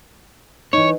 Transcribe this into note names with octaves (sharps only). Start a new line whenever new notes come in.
E3 D#4 C#5